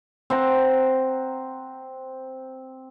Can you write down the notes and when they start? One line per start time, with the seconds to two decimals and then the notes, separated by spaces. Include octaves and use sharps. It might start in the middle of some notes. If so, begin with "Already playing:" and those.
0.30 C4 C5 F#5 A#5